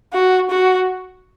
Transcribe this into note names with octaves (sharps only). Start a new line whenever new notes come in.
F#4
F#4